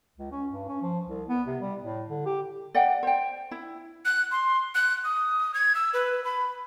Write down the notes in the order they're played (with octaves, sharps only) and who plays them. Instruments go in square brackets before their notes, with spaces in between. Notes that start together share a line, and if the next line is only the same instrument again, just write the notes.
[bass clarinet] C#2
C#4
G2
C#4
F3
C2
B3
C3
G3
A2
D3
G4
[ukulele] D5 D#5 F#5 G5
C5 G5
E4
[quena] F#6
C6
F#6
D#6
G#6
E6
B4
B5